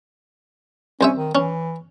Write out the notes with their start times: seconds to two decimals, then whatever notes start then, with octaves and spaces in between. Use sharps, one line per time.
1.01 C2 C#4 C5 E5
1.17 D#3
1.35 E3 C#4